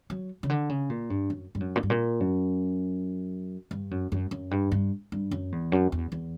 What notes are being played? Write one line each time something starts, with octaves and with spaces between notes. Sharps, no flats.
F#3
C#3
D3
C#3
A#2
G2
F#2
G2
F#2
A#2
G2
A#2
F#2
G2
F#2
F#2
F#2
G2
G2
G2
F#2
E2
F#2
E2
E2